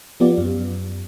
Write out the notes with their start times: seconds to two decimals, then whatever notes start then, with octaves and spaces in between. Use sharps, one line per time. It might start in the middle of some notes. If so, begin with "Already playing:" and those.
0.20 F3 B3 F4 G4 D5
0.38 F#2